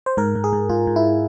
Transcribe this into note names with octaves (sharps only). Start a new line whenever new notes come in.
C5
G#2 A#4
G#2
G#4
G#2
G#2 F4
G#2
E4